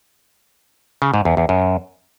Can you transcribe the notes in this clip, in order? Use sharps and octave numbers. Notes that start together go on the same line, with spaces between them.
C#3
G#2
E2
E2
F#2